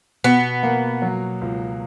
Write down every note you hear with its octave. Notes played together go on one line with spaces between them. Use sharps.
B2 B3
A#3
F#3
C#2